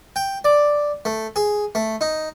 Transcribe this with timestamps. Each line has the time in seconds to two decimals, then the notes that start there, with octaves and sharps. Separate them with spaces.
0.16 G5
0.44 D5
1.05 A3
1.36 G#4
1.75 A3
2.01 D#4